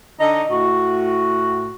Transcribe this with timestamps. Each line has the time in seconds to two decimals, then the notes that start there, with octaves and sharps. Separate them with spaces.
0.19 D3 D#4
0.50 A2 F#4